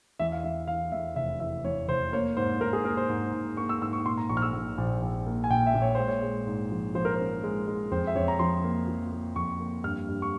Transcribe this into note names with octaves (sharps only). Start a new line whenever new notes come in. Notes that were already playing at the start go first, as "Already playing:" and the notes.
E2 E5
F5
E2 E5
E3 F5
E2 E5
F1 E5
E3 E5
E2 C#5
F1 C5
A#3 C#5
G#2 C5
G#2 A#4
G#4
A#3 A#4
C5
G#2
G#2
A#3 C#6
E6
G#2 E6
C#6
A#2 C6
A#5
A#1 C#6
F6
E6
A#2
A#1
A#1
A#3
G#5
A#2 G5
E5
A#2
C#5
G#3 C5
C#5
G#3
G#2
F3
F3 C5
A#4
C#4 C5
G#3
G#3
F2 C5
E5
F2 C#5
A#5
F3 C6
A#3
F3
A#3
F2 C#6
A#3
G2 F6
G2
C#6